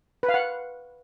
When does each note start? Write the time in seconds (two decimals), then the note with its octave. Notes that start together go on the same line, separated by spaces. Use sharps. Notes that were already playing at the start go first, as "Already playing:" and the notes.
0.23 B4
0.29 F5
0.34 F#5